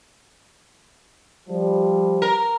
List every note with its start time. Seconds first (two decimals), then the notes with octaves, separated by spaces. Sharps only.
1.49 F3 G3
2.22 A#4